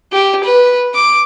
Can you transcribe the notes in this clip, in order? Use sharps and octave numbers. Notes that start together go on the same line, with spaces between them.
G4
B4
D6